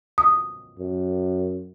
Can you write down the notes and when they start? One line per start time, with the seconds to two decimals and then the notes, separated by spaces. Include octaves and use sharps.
0.18 D#6
0.79 F#2